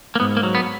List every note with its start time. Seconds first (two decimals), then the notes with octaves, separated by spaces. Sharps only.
0.15 A#3
0.20 G#2 B3
0.37 A#3
0.43 F#3
0.55 B3